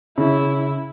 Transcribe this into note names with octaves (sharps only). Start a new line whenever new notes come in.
C#3 E4